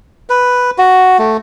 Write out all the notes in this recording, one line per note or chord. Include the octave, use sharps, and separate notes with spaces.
B4
F#4
A3